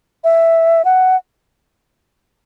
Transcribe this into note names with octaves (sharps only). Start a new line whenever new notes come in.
E5
F#5